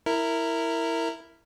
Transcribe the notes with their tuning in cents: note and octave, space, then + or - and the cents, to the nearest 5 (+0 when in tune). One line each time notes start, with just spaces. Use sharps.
E4 +0 A#4 -15